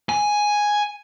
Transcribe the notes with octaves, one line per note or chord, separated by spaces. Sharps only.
G#5